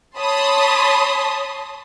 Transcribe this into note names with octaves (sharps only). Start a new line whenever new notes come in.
C#5 A5 B5 C6 D#6